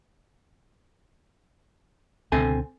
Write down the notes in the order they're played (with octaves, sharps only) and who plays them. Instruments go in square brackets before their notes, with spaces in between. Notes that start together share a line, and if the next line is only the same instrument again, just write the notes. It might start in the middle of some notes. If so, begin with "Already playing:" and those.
[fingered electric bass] C#2 B2 D3 [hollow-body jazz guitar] C4 A4 G#5